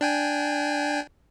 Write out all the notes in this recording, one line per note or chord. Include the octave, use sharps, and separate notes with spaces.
D4 G5 G#5